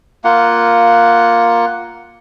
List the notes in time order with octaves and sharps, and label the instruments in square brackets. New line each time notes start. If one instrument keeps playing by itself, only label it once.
[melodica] A#3 F4 F#5